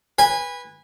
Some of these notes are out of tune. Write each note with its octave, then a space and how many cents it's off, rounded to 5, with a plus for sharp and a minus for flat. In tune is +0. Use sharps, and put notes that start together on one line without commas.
B4 -10 G#5 -25